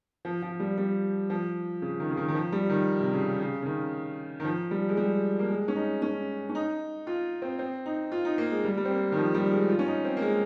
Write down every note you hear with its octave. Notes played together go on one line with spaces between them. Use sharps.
F3
F3
G3
G3
F3
C#3
D#3
C#3
D#3
D#3
F3
G3
D#3
C3
C#3
C#3
C#3
D#3
D#3
F3
G3
G#3
G3
A#3
G#3
C#4
D#4
C#4
C#4
D#4
F4
C4
C4
D#4
F4
D#4
A#3
G#3
G3
G3
C4
A#3
D#3
F3
G3
G#3
F4
C#4
D#4
C4
A#3
G#3